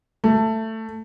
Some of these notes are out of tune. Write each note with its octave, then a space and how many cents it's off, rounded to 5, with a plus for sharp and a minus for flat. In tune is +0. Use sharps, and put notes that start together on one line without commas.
A3 +15